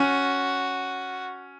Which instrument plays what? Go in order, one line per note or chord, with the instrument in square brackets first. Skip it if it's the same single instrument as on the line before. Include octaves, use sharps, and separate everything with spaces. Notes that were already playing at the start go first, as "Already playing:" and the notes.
Already playing: [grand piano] C#4 [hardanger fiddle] F#4